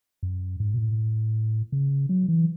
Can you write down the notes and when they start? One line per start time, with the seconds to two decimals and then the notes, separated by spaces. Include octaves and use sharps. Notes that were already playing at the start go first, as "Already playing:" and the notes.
0.23 F#2
0.60 G#2
0.74 B2
0.78 A2
1.72 C#3
2.09 F#3
2.28 E3